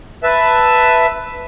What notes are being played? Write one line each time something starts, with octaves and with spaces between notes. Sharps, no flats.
B4 E5 A5